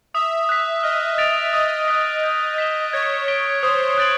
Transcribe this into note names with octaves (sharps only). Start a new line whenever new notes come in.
E5 D#6
F#6 B6
D#5 F6
A6 D7 F7
D#5 D#6
F#6 B6
G6
B6 E7 G7
C#5 G#6
B6 D7 G7
C5 D#6
F#6 A6 D7 F#7